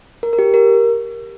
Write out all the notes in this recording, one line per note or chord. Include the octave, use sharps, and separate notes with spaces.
A#4
A#4
G4
A#4